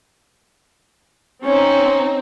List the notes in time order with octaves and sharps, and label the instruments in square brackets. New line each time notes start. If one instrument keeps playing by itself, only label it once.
[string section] C4 D#4 [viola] C#4 [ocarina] C#5